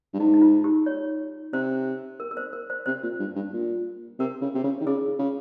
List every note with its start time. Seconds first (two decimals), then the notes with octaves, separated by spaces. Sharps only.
0.14 G2
0.19 G#2 D#4
0.34 D#4
0.42 F4
0.64 G4
0.86 C#5
1.53 C3 C5
2.20 A#4
2.31 A#4
2.37 C5
2.53 A#4
2.70 C5
2.86 C3 C5
3.03 A#2
3.20 G2
3.36 G2
3.53 A#2
4.19 C3 A#4
4.42 C#3
4.55 C3
4.64 C#3
4.81 D#3
4.86 C#3 G#4
5.19 C#3